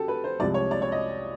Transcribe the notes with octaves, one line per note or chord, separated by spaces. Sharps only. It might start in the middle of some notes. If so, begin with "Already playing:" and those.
Already playing: C#3 F#4 G4 A4
B4
C5
C2 C3 F3 G#3 D5
C#5
D5
C#5
D#5